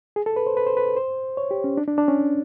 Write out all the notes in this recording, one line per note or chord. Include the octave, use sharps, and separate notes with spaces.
G#4
A4
B4
C5
B4
C5
B4
C5
C#5
G4
C#4
D4
D4
D4
C#4